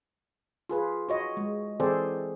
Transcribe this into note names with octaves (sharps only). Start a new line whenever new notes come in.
F4 G#4 B4
F#4 C#5 D#5
G#3
E3 C4 G#4 A4 C5 D5